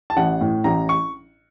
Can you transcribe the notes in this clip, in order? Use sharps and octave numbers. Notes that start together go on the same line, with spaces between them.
A5
A1 F#5
A2
A1 A#5
C#6